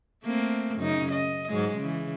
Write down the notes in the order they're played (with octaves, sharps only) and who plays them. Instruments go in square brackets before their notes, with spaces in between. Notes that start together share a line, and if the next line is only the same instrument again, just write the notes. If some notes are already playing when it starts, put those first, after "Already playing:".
[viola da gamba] A3 A#3 C4
F#2 C#3 D#4
D#5
G#2 F#3 G#3
C#3 E3